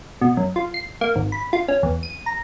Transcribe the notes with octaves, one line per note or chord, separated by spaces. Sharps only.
B2
F#2
F4
C7
A#3
G#1
B5
F4
C#4
E2
D#7
A#5